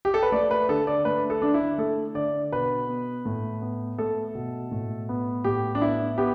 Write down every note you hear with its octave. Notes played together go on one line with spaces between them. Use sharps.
G4
A4
B4
A3 D5
B4
D3 A4
D5
A3 B4
A4
D3 D4
E4
A3 A4
D3 D5
B2 B4
B3
A2
B3
A3 A4
B2
A2
B3
A2 G4
D4
B3 E4
B3 G4